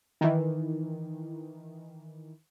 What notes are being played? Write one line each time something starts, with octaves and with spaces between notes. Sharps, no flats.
D#3 E3